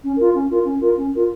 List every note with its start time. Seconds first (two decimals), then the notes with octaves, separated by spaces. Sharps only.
0.01 C#4
0.16 F4 A#4
0.33 C#4
0.49 F4 A#4
0.64 C#4
0.80 F4 A#4
0.96 C#4
1.13 F4 A#4